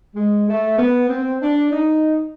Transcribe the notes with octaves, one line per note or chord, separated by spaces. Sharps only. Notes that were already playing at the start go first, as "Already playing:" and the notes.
G#3
A3
B3
C4
D4
D#4